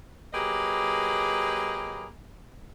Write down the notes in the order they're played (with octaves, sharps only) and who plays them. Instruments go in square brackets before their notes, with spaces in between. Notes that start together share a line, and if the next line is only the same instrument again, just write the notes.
[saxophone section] F#3 A#3 G4 G#4 B4 D#5